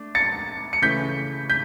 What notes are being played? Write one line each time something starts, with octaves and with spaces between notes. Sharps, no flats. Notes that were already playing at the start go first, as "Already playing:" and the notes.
Already playing: A3 D4
A6 C#7
C#7
C#3 E3 A3 C#4 G6 B6
G6 B6